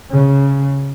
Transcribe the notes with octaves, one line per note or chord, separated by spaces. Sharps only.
C#3